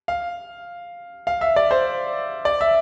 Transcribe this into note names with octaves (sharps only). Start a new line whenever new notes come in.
F5
F5
E5
D5
C5
D5
E5